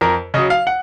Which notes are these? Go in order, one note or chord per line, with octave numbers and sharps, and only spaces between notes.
F2 A#4
C#3 F#3 D#5
F5
F#5